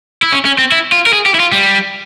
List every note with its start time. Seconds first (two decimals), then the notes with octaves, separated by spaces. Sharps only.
0.23 E4
0.32 C#4
0.45 C#4
0.58 C4
0.72 E4
0.92 F4
1.06 A#4
1.13 G#4
1.26 G4
1.35 E4
1.40 F4
1.52 G3